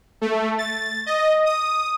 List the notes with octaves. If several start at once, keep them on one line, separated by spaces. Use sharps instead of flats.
A3
A6
D#5
D#6